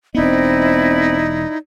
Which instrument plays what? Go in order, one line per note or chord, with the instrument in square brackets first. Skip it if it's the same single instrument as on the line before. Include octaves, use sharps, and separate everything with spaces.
[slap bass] E1 B3 [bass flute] C4 [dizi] D#4 [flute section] E4 D5 D#5